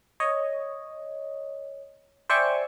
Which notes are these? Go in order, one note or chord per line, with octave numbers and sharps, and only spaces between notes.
C#5 D#5
C5 D5 E5 G5 G#5 C#6